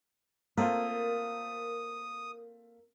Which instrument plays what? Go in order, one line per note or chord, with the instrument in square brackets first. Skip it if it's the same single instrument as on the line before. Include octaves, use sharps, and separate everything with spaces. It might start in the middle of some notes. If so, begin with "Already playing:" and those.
[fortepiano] A3 C4 F4 [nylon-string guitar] A#3 [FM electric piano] A#4 [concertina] D#6